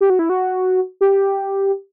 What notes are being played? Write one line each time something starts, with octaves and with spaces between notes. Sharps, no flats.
G4
F#4
E4
F#4
G4